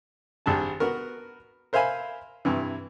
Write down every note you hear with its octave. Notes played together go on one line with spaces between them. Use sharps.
G#1 G3 D4 A5
B3 F#4 A#4
A#4 C5 E5 F5 G#5 B5
G2 C3 E3